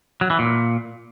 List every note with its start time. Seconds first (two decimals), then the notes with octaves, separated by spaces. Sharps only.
0.21 F#3
0.30 E3
0.39 A#2